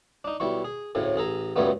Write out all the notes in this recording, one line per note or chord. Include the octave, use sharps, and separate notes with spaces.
D4 D#4
B1 G3 E4 C#6
G#4
D2 A2 C#3
A1 G#4 A4 A#5
C#2 F#2 C#3 G3 A3 B3